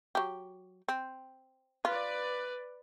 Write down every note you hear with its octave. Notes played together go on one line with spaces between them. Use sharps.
F#3 G4
C4
F4 B4 D5